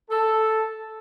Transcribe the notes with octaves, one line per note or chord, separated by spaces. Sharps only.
A4